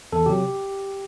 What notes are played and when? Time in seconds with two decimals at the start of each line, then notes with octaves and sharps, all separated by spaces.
0.12 E2 A4
0.26 C3 F#3 G4